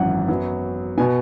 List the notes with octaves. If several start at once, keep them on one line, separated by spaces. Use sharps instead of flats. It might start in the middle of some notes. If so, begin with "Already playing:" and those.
Already playing: G#1 F#2 E3 C#4 F#5
F#2 F#3 B3
B2 B3 G#5